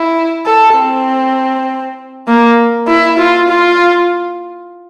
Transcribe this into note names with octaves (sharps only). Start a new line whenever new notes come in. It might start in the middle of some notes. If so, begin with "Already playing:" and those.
Already playing: E4
A4
C4
A#3
E4
F4
F4